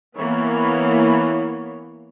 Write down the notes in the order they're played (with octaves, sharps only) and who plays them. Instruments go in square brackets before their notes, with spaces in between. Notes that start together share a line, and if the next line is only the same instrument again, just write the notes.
[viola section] E3 A#3 B3 C#5